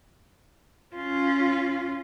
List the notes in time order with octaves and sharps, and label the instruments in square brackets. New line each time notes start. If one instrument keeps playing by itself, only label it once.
[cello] C#4 F4